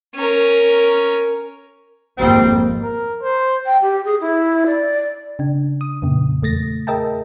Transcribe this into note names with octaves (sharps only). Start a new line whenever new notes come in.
C#4 A#4
G#1 F2 G3 A#3 C4
A#4
C5
G5
G4
G#4
E4
D5
C#3 D4
D#6
F2 A#2 C#3
E2 A3 A6 A#6
G#4 A#4 D#5 E5 G5 A5